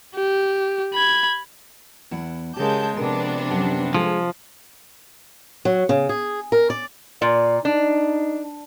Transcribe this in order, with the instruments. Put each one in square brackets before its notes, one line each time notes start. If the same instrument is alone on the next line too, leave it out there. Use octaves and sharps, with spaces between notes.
[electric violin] G4
B5 G#6
[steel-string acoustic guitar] E2 E4 F#5
[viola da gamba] C#3 G#3 [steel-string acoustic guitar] G4 A#4 [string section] A5 G6
[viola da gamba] C3 [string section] F3 B3 D4 [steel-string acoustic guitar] A#4
[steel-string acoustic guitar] F#2 G4 F#5
[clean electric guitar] F3 [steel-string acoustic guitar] G#3 G#4 A4
[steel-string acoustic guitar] F#3
C#3
G#4
A#4
D5
[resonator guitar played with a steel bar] A#2 [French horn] D5
[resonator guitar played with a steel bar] D4 [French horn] D#4